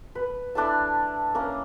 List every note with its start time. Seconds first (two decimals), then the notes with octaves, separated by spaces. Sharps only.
0.15 B4
0.55 D4 E4 A4 A5
1.35 A#3 C#4 A#5